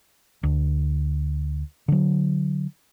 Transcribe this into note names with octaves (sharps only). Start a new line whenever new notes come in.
D2
D3 F#3